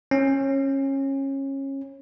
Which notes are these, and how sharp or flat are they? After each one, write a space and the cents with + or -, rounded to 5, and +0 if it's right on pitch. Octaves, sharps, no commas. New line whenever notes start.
C#4 -25